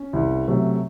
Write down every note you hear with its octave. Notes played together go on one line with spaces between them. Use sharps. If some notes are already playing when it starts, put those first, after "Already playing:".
Already playing: C#4
C2
C3 F#3 A3